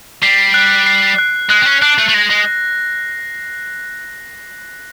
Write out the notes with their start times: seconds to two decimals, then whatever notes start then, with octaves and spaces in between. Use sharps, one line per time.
0.22 G3 C7
0.54 F#6
0.86 C7
1.18 F#6
1.50 G#3 F#6
1.62 C4
1.66 C#4
1.82 D4 F#6
1.98 A3
2.09 A3
2.14 G#3 A#6
2.30 G#3